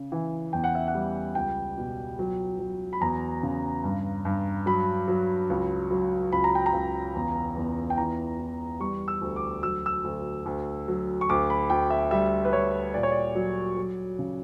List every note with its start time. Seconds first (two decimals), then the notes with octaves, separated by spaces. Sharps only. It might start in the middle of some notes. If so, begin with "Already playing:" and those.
Already playing: C#3
0.12 E3
0.53 E2 G5
0.64 F#5
0.75 E5
0.88 F#5
0.95 G3
1.35 C#2 G5
1.77 B2
2.19 F#3
2.59 F#3
2.93 B5
3.01 E2 A#5
3.43 C#3
3.84 G2
4.25 G2
4.66 F#3 B5
5.08 F#3
5.50 C#2
5.91 F#3
6.32 C#2 B5
6.44 A#5
6.55 G5
6.66 A#5
6.73 C#2
7.15 E2
7.56 E2
7.90 G5
7.98 E3 A#5
8.40 E3
8.80 G3 C#6
9.08 E6
9.21 D2
9.36 D6
9.63 F#3 E6
9.86 E6
10.04 D2
10.46 D2
10.88 F#3
11.21 C#6
11.29 D2 D6
11.50 B5
11.70 D2 G5
11.90 E5
12.11 G3 E5
12.45 B4
12.53 G3 C#5
12.94 A#2 D5
13.03 C#5
13.12 D5
13.35 F#3
13.77 F#3
14.19 C#3